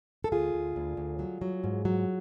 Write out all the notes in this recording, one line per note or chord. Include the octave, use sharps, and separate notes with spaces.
A4
D2 F4 G#4
D2
D2
D2
F#3
F#3
G#2
F#3